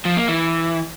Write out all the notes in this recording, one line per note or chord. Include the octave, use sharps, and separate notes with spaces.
F3
A#3
E3